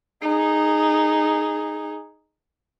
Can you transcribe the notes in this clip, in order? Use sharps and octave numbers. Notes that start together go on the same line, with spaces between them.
D#4 G#4